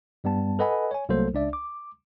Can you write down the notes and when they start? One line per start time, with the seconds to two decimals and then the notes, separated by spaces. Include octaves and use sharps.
0.24 G2 G3 B3 A5
0.59 A4 B4 D#5 F#5 G#5 B5
0.91 C#5 G#5
1.09 C2 F#3 A3 A#3 A4 C5
1.34 C#2 D4 D5 E5
1.53 D6